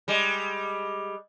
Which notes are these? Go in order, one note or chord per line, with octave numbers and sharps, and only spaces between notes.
G3 G#3